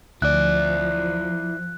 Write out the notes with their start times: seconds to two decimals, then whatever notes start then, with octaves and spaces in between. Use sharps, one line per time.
0.22 D2 F3 E4 D5 F#6